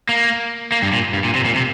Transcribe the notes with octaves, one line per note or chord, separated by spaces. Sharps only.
A#3
A#3
G2
A#2
G2
A#2
C3
A#2
C3